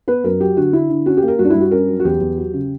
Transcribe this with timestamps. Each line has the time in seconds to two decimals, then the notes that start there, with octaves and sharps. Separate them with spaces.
0.08 B3 B4
0.24 F#2 A#4
0.40 F#3 G4
0.56 D3 F#4
0.73 D3 E4
0.90 D3
1.06 C#4 F#4
1.17 G4
1.23 A#3
1.28 A#4
1.39 G2 F#4
1.45 D4
1.50 G2 E4
1.61 F#4
1.71 C#4 A#4
1.88 F#3
2.00 F#4
2.05 E2 G4
2.21 E2
2.37 F#3
2.54 C#3